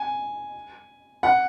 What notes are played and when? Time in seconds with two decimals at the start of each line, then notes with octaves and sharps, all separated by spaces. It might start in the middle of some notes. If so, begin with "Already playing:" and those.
Already playing: G#5
1.23 F#5